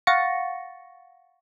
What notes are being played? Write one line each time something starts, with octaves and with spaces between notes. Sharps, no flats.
F5 F#5 C#6 A6 A#6 C#7